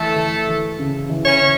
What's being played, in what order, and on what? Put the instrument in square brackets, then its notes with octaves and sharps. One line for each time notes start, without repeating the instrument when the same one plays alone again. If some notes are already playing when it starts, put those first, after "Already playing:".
Already playing: [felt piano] E3 [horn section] A3 A4
[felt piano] E3
E3
C#3
E3
[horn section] C#4 C#5
[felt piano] C#3